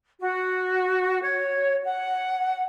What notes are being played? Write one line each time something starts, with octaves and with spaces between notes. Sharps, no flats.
F#4
C#5
F#5